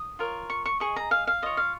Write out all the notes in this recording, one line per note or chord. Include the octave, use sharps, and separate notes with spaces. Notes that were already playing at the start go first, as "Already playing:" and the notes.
Already playing: D#6
F4 A#4 C#5
C#6
C#6
G#4 D#5 C#6
A#5
F5
F5
F4 C#5 D#5
F5